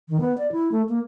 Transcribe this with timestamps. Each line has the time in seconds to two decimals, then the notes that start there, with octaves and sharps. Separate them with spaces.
0.09 D#3
0.20 B3
0.38 D5
0.52 E4
0.72 A3
0.89 A#3